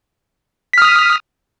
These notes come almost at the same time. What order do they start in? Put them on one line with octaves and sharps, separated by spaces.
B6 F6 D#6